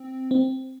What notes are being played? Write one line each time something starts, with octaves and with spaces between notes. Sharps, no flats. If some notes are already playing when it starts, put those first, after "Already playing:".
Already playing: C4
C4